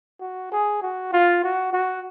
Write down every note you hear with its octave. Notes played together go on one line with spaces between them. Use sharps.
F#4
G#4
F#4
F4
F#4
F#4